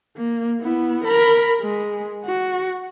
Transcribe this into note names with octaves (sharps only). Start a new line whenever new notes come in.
A#3
B3 E4
A#4 B5
G#3
F#4